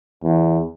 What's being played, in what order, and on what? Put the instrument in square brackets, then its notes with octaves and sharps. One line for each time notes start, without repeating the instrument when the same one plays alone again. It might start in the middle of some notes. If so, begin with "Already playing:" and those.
[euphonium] E2